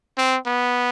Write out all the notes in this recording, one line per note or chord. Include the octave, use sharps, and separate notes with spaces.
C4
B3